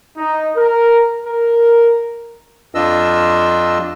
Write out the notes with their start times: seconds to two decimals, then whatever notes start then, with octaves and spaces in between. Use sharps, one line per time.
0.18 D#4
0.55 A#4
1.26 A#4
2.75 F2 D4 F4 D#5 E6